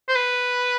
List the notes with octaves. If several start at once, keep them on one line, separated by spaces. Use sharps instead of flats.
C5
B4